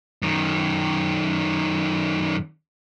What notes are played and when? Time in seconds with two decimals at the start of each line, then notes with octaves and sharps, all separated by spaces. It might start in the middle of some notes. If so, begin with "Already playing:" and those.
0.22 F#2 D#3